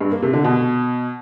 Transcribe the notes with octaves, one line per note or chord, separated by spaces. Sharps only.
G2
A#3
C3
D3
B2